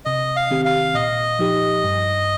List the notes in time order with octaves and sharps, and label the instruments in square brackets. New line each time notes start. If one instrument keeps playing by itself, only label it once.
[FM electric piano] C3 [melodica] D#5
[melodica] F5
[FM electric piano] D#3 C4 G4
[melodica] F5
[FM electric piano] A#2 [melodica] D#5
[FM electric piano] F3 D#4 G4
G2